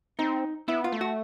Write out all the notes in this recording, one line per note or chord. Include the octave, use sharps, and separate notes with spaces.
C4 D#4
B3 E4
F4
A3
F#4